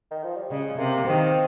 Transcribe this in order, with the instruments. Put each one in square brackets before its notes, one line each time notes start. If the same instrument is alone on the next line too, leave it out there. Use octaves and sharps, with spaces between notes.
[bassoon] D#3
F3
G3
[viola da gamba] C#3 [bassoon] G#3
[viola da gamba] C3 [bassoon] A#3
[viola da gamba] D#3 [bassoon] C4